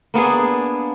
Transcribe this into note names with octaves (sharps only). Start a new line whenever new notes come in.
A#3 B3 D4 G#4